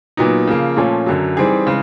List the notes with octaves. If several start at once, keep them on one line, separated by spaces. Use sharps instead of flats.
A#2 F#3 B3 D#4
C#3 F3 A#3
A#2 F3 A3 C#4 F4
F#2 D3 F#3
E3 G3 C4 D#4 G#4
C#3 E3 G#3